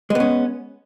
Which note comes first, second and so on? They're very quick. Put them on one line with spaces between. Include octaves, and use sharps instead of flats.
G#3 B3 C#4